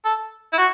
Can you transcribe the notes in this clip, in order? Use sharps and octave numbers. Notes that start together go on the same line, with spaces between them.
A4
E4
F#4